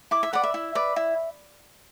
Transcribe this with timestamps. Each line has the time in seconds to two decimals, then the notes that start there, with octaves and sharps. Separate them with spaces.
0.11 E4 D6
0.23 E5
0.33 B4 D5 F#5
0.44 E5
0.54 E4
0.75 B4 D5
0.96 E4